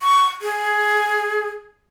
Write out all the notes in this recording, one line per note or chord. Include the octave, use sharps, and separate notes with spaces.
C#6
G#4